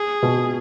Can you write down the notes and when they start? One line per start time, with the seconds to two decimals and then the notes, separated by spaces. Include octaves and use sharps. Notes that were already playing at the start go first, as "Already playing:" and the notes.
Already playing: G#4
0.23 B2